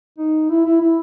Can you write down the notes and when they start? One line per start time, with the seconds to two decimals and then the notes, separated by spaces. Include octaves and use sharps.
0.19 D#4
0.50 E4
0.65 E4
0.81 E4